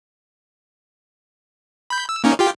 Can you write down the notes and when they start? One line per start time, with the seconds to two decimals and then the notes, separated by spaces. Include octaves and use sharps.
1.90 B5 G6
2.09 E6
2.24 A#3 C#4 D#4
2.39 F4 G4 G5